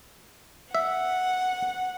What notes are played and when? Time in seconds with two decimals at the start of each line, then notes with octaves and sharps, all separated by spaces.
0.75 E5 F#5